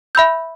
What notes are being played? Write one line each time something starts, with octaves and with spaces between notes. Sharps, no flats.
E5 B5 E6 G6